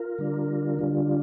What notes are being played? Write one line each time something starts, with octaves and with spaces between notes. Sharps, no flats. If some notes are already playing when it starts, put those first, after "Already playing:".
Already playing: F4 A#4
D3 G3 D4
D3 G3 D4 F4